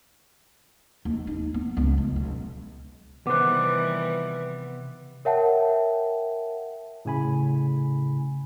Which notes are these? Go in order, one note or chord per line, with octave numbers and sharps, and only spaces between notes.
D#2
D#4
B3
C#2
G#3
B1
C3 D#3 E3 G3 B3 C5 D6 F#6
A#4 C#5 E5 F#5 G5 A5
A2 C#3 G#5 B5